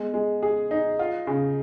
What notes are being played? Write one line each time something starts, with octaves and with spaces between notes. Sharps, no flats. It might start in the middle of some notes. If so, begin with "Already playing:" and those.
Already playing: G#3 B3
G#3
G#4
D#4
F4
C#3